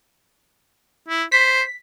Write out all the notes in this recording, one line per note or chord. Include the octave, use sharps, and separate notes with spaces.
E4
C5 B6